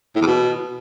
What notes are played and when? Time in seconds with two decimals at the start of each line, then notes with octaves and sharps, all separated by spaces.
0.15 A2
0.21 E2
0.27 B2